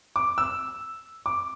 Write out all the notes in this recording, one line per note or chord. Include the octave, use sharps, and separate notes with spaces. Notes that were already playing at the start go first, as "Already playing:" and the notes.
D6
E6
D6